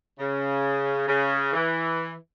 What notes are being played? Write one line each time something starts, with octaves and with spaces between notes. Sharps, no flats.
C#3
C#3
E3